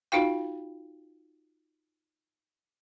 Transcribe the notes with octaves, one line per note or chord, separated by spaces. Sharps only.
D#4 F4 F#4 F5 G5